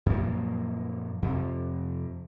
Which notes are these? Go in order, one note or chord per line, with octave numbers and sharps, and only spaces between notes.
F#2 A#2 F3 A#3
F2 C3